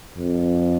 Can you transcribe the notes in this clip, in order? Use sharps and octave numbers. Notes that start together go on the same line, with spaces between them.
F2